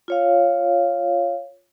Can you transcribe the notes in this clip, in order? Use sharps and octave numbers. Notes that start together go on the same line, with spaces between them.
F4 C#5 F5